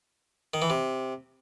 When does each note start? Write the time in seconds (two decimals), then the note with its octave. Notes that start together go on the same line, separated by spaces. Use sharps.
0.54 D#3
0.62 E3
0.70 C3